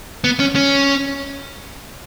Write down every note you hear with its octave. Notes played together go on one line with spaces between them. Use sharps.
B3
C#4
C#4